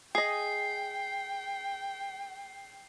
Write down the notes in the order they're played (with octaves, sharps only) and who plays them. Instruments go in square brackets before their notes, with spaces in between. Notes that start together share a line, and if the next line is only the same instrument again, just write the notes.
[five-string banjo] G#4 D#5 [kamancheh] G5 [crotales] C7